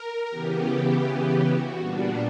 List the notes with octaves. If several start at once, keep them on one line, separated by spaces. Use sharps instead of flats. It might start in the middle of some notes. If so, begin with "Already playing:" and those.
Already playing: A#4
C#3 E3 B3 G4
F#4
A#2 G3 B3 D4